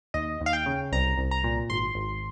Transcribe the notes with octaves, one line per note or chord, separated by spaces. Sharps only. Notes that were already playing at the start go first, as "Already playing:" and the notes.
D#2 D#5
D#2
F5
G5
C#3
C2 A#5
C2
A#5
A#2
G#1 C6
G#1